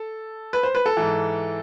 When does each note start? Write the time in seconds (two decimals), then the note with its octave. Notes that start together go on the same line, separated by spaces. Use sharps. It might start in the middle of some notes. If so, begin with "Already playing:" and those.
Already playing: A4
0.53 B4
0.63 C5
0.75 B4
0.86 A4
0.97 G#2 E3